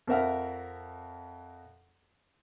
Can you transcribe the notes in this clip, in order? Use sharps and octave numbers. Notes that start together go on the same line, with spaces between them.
F2 C4 A#4 E5 F#5 F6